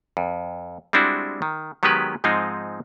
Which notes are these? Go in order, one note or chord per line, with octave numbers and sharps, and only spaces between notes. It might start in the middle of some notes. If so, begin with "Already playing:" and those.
F2
G3 G#3 C4 D4 E4 F#4
D#3
D#3 F#3 G#3 B3 G4 B4
G#2 F3 G#3 C4 D#4